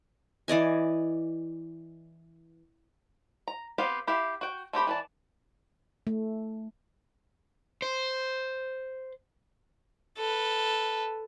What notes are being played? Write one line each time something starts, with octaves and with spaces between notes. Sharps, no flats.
E3 D5 D#5 G#5
A#5
B3 C4 G4 F5
E4 G4 E5 F5
F#4 G5
A3 C4 G4 B5
E3 D5 A5
A3
C5
A4 B4